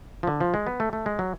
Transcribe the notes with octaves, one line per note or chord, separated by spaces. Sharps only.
F3
D3
F3
G#3
B3
A3
A3
G#3
F#3